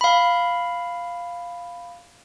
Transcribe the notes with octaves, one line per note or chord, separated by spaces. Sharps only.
F5 B5